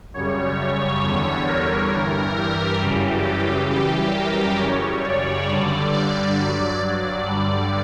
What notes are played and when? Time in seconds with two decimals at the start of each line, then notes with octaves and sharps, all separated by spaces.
0.14 F#2 C#3 G3 C#5
1.03 E2 D3 G3
1.47 A#4
1.93 G2 E3 G3
2.37 G4
2.81 F#2 C#3 E3 G3
3.70 F#2 E3 G3 G4
4.14 A#4
4.59 F#2 C#3 G3 C#5
5.05 D5
5.48 G2 D3 G3
5.93 D5
6.37 G2 F#3
6.82 D5
7.27 G2 D3 G3